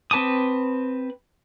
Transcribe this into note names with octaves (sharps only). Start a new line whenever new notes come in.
C4 B4 A5 D6 D#6